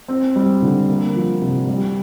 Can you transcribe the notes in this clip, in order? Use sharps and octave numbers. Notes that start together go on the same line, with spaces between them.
C4
G3
D3
A#3
F3
C3
G3